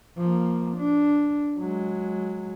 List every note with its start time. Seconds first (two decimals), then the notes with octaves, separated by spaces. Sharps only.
0.18 F3 A#3
0.77 D4
1.59 F#3 G#3